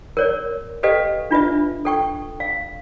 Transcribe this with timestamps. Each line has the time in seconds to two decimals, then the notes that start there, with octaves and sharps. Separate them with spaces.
0.17 A#4 C#5 D5
0.83 G4 A4 B4 D#5 F5 G5
1.31 D4 F4 B4 E5
1.85 A4 G5 C#6
2.40 F5